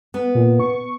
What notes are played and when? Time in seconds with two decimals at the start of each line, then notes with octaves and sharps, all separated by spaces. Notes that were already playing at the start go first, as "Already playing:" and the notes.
0.14 B3
0.35 A#2
0.60 C#6